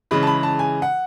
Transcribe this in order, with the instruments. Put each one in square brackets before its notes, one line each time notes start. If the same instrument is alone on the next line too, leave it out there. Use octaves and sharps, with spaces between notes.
[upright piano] C#3 E3 G#3 B5
A5
B5
A5
G#5
F#5